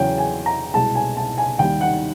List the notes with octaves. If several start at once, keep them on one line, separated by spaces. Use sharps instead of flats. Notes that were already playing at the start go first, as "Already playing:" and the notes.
Already playing: E2 C#3 F#3 G5
G#5
A#5
C2 B2 G#3 A5
G#5
A5
G#5
D#2 D#3 G3 G5
F#5